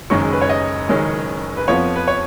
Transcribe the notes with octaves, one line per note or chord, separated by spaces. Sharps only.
F#1 F#2 D#3 G#3 C#4 C#6
B4
C#5
D#5
F#1 F#2 D#3 G#3 C#4
B4
F2 F3 B3 C#5
B4
C#5